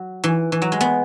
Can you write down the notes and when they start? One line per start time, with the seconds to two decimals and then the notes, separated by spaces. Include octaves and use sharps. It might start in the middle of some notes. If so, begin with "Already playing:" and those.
Already playing: F#3
0.24 E3
0.52 E3
0.62 F#3
0.72 G#3
0.81 B3